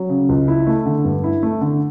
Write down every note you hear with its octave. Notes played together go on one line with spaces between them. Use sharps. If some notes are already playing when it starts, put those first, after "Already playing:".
Already playing: F#3
C#3
C#2
E4
A3
D3
G2
E4
A3
D3